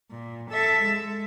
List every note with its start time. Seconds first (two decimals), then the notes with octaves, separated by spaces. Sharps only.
0.11 A#2
0.51 A4 E5
0.82 G#3